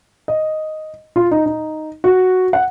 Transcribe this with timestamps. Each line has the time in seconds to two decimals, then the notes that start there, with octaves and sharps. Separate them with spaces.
0.28 D#5
1.16 F4
1.31 D#4
1.46 D#4
2.04 F#4
2.53 F#5